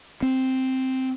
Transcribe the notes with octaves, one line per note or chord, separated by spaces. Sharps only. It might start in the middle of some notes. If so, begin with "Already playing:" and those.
C4